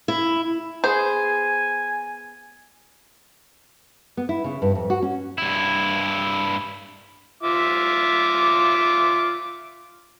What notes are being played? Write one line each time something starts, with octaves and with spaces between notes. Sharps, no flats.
E4
B3 G#4 C5 G#5
B3
E4
C#3
G2
F2
F#4
C#4
G2 E4
F4 E5 D6